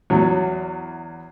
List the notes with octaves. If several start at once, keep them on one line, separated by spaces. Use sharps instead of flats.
E2 F#3